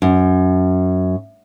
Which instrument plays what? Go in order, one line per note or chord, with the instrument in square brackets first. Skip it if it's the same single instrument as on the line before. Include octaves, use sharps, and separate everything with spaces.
[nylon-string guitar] F#2